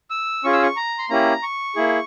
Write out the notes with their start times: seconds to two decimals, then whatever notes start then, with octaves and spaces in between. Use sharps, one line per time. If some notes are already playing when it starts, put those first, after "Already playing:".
0.10 E6
0.44 C#4 F4 G#4 C#6
0.53 E6
0.63 C#6
0.76 A#5
0.99 C6
1.09 A#3 C#4 E4 G4 A#5
1.43 C#6
1.76 A#3 E4 G#4